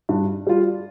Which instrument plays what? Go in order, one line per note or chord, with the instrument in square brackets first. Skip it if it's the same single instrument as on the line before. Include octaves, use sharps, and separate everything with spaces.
[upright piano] G2
G3 F4